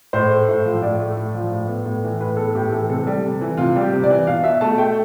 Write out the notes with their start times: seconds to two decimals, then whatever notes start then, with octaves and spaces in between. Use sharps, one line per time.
0.13 A2 C5
0.30 A3
0.48 A2
0.65 F3
0.82 A2 D5
0.99 A3
1.17 A2
1.35 F3
1.52 A2
1.68 B3
1.85 A2
2.04 E3
2.20 A2 B4
2.37 B3 A4
2.55 A2 G4
2.72 E3 A4
2.89 C3 A4
3.07 G3
3.23 C3
3.41 E3
3.57 C3 F4
3.76 G3
3.81 G4
3.92 C3
4.03 D5
4.10 E3
4.27 B2 F5
4.44 B2 E5
4.61 A3 A5
4.78 A3 G5